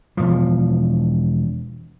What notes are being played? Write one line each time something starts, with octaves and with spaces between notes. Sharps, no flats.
E1 F3